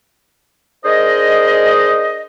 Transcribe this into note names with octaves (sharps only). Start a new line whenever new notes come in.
D4 G#4 A#4 C5 D#5